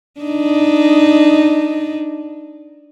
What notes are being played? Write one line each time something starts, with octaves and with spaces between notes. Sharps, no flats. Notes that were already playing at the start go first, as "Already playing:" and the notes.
D4 D#4